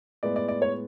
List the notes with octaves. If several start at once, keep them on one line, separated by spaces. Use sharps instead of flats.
A2 G#3 B3 D5
D5
D5
C#5